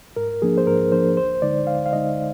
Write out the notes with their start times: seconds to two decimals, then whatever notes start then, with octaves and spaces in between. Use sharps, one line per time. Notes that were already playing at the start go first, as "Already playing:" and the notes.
0.16 G#2 A#4
0.42 F3 A#3 D4 G#4
0.58 C5
0.67 G#2 A#4
0.92 F3 A#3 D4 C5
1.17 D2 C5
1.42 D3 G#3 D#4 D5
1.67 D2 F5
1.86 F5
1.92 D3 G#3 D#4 D#5